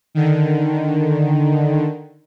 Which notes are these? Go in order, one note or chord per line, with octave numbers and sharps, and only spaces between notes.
D3 D#3